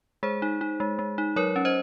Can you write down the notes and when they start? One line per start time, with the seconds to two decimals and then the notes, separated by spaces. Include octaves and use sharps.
0.23 G#3 G#4 C5
0.42 D#4
0.61 D#4
0.80 G#3
0.99 G#3
1.18 D#4
1.36 F#3 A#4 C#5
1.56 C#4
1.65 C5 D#5